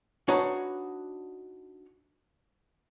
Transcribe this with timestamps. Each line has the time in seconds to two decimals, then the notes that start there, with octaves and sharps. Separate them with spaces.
0.28 D4 D#4 F#4 B4 C#5 F#5